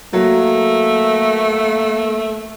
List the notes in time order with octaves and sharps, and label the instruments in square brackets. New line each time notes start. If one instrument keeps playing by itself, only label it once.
[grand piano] F#3 [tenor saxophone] A3 [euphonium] A#3